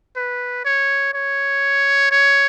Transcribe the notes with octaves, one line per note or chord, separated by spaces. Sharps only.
B4
C#5
C#5
C#5